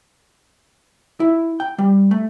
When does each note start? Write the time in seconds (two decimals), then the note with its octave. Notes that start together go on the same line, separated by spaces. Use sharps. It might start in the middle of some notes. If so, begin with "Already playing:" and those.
1.20 E4
1.60 G5
1.78 G3
2.11 A3